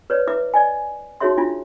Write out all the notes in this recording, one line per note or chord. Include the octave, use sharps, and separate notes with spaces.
B4 C#5 D5
E4 B4 E5 D6
D5 D#5 G#5
D#4 F#4 G#4 C#5 E5 C6
D4 E4 F4